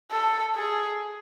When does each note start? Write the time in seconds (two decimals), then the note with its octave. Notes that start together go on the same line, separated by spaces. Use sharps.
0.12 A4
0.56 G#4